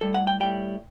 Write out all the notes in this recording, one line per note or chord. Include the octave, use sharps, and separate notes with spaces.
A2 G3 A4
F#5
G5
A2 G3 G5